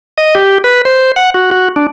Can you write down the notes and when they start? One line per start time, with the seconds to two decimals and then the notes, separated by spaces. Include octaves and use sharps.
0.18 D#5
0.35 G4
0.64 B4
0.85 C5
1.16 F#5
1.34 F#4
1.51 F#4
1.76 D4